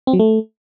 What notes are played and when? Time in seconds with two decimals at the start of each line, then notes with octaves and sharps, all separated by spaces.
0.07 C4
0.13 F#3
0.19 A3